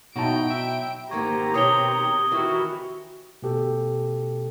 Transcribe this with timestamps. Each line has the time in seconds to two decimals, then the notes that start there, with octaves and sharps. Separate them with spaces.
0.16 B2 F#3 D#4 E4 F#4 G5 A5 D7
0.50 E5
1.11 G#2 D#3 A#3 C4 G4 A#5 C#6 G#6
1.54 B2 D#3 C#5 D#6 G7
2.32 D#3 E3 E4 F#4
3.42 B2 A3 G4 A4